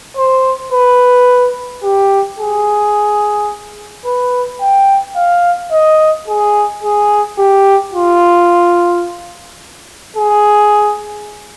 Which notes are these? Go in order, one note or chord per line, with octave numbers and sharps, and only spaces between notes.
C5
B4
G4
G#4
B4
G5
F5
D#5
G#4
G#4
G4
F4
G#4